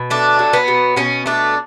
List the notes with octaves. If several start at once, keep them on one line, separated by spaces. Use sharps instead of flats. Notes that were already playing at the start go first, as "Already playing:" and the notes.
Already playing: B2
A3 D4
F#3
B3
B2
B2 C#4
A3 D4